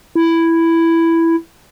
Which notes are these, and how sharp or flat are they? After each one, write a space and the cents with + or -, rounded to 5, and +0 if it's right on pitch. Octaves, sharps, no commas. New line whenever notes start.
E4 +5